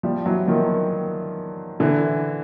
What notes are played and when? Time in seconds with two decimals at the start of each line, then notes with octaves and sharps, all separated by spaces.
0.03 F3 G3
0.26 E3 F#3
0.48 D#3 F3
1.80 D3 E3